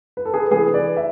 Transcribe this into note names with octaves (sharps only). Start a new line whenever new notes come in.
B4
A4
G#4 B4
C3 E3 A3 G#4 B4
B4 D5
E5